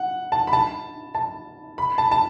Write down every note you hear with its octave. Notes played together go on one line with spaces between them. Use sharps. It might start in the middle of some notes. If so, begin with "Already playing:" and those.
Already playing: F#5
A5
B5
A5
A5
B5
A5
A5